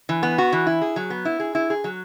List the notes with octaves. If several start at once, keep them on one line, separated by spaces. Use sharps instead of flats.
E3
B3
F#4
E3
E4
G#4
F#3
B3
E4
G#4
E4
G#4
F#3